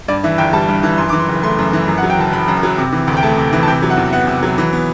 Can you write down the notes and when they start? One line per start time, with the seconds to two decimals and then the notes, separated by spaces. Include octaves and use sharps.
0.08 G2 D5
0.24 E3 E5
0.38 G1 G5
0.53 G3 A5
0.68 G2
0.83 E3
0.98 F#2 C6
1.09 E3 D6
1.19 C6
1.28 F#1
1.43 A3 C6
1.59 F#2
1.73 E3
1.88 F#2
1.98 F#5
2.03 F#3
2.10 G5
2.18 F#1 A5
2.32 F#1 B5
2.48 F#2
2.63 F#3
2.78 C3
2.92 E3
3.07 D2
3.17 G5
3.23 A3 A5
3.37 C3
3.53 E3
3.63 A5
3.68 C3 G5
3.82 F#3
3.90 F#5
3.97 E2
4.13 B3 F#5
4.27 C3
4.43 F#3
4.58 E3
4.73 B3